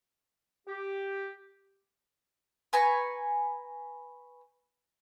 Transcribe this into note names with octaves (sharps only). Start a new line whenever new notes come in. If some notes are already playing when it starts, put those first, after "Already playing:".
G4
B4 G#5 A#5 C#6